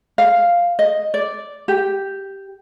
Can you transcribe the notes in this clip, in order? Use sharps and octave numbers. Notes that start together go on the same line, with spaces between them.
F5
D#5
D5
G4